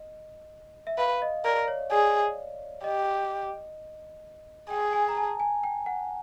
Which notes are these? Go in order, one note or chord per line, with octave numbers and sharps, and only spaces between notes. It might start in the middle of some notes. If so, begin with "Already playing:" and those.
Already playing: D#5
E5
B4 F5
D#5
A#4 D5
C#5
G#4 D5
G4 D#5
G#4 G5
G#5
A#5
A5
G#5
G5
F#5